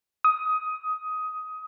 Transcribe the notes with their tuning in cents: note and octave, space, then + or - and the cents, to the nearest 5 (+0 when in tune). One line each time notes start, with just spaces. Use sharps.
D#6 +15